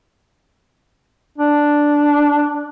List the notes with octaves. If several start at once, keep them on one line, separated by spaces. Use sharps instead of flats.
D4